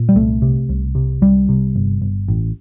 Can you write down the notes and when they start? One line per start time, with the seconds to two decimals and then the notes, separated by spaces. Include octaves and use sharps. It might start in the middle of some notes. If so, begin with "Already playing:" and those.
Already playing: A#2
0.09 G3
0.15 C2 A3
0.42 C3
0.69 C2
0.95 C3
1.21 C2 G3
1.49 C3
1.76 G1
2.02 G1
2.28 A1